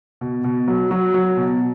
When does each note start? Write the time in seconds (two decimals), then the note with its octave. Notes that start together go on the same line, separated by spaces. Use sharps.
0.21 B2
0.44 B2
0.68 F#3
0.91 F#3
1.14 F#3
1.37 B2